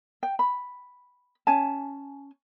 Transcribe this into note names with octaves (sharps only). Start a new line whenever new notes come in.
G5
B5
C#4 G#5 A5